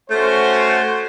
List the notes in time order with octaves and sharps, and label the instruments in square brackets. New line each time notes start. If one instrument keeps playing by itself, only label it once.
[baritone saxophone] A3 [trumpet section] C#4 F#4 C5